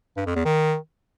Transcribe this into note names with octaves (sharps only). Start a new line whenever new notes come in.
G2
F2
E2
D#3